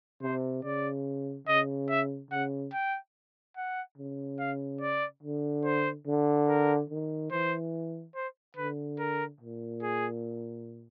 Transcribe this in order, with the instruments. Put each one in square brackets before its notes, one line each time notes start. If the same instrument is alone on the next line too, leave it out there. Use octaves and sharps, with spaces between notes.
[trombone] C3 [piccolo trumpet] C5
[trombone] C#3 [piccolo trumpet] D5
[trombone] C#3 [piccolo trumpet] D#5
[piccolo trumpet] E5
[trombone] C#3 [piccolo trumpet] F#5
[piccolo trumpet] G5
F#5
[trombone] C#3
[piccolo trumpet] F5
D5
[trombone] D3
[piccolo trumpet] C5
[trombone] D3
[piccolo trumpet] A#4
[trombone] D#3
[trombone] E3 [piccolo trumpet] C5
[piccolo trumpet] C5
[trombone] D3 [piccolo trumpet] B4
[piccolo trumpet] A#4
[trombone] A#2
[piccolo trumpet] G#4